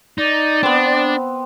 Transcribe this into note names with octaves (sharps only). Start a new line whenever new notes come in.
D#4 D5
B3 C4 D4